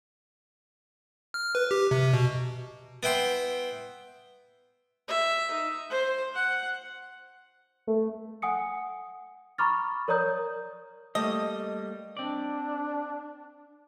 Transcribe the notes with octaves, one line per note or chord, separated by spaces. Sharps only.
F6
B4
G4
C3
B2
B3 E4 G5 C6
E5
D#4
C5
F#5
A3
F#5 G#5 D#6 C#7
A#5 B5 C#6 D6 F6 A6
A#4 C#5 D5 A#5 D#6 G6
G3 A3 A#3 D#5
C4 D4 D5